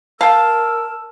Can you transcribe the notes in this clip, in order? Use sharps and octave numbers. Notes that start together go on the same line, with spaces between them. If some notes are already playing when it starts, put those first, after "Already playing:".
A#4 F5 G5 A5 E6